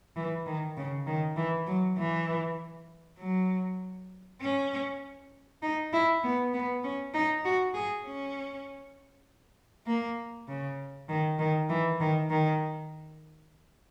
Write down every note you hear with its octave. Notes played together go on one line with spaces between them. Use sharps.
E3
D#3
C#3
D#3
E3
F#3
E3
F#3
C#4
D#4
E4
B3
B3
C#4
D#4
F#4
G#4
C#4
A#3
C#3
D#3
D#3
E3
D#3
D#3